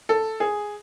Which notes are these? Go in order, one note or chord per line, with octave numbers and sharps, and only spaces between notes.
A4
G#4